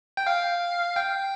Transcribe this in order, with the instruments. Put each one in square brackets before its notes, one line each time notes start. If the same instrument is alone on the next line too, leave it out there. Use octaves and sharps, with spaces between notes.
[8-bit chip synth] G5
F5
G5